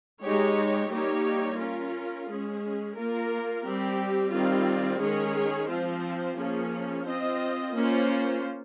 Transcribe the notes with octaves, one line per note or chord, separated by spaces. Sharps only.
G#3 D#4 G4 C#5
G3 A#3 D#4 G4 C#5
C#4 F4 A#4
G#3 C#4 G#4
A#3 F4 A#4
G3 C4 G4
D#3 G3 C4 F4
D#3 G#3 C#4 G#4 C#5
F3 C4 F4 C5
F3 A#3 C#4 F4 G#4
C4 F4 C5 D#5
A#3 C#4 F4 C5